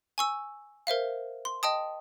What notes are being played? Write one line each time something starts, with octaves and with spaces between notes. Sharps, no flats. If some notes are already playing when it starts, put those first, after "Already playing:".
G#5 C#6 E6
A#4 C5 E5 F5
C6
D#5 G5 A5 D#6